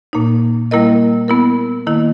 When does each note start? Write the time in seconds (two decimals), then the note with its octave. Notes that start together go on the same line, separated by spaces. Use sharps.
0.13 A#2 A#3 D#4
0.71 G3 A#3 E4 A#4 D#5
1.28 B3 E4 A#4
1.87 D#3 A#3 E4